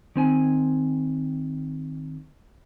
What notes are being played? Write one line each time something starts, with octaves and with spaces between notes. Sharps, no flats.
D#3 C4 G#5